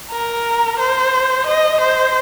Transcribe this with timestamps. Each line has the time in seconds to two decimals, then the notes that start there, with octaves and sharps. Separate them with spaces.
0.11 A#4
0.79 C5
1.46 D#5
1.80 C5